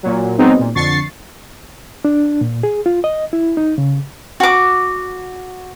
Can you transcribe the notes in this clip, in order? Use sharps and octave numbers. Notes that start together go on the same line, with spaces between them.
A#2 F#3
F#3 G#3 B3 C4 D#4
A#2
F2 D3 C#6 A6 C7
D4
A#2
G#4
F4
D#5
E4
D#4
C#3
F#4 D6